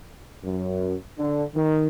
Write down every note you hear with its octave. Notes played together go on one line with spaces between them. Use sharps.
F#2
D3
D#3